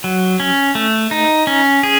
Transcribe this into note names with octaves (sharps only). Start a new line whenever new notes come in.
F#3
C#4
A3
D#4
C#4
G#4